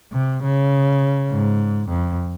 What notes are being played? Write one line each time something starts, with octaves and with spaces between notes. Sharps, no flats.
C3
C#3
G#2
F2